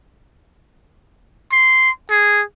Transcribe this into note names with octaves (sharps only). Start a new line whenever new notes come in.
C6
G#4